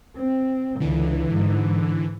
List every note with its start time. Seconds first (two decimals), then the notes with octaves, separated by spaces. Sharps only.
0.17 C4
0.80 C#2 D3 E3
1.32 G#2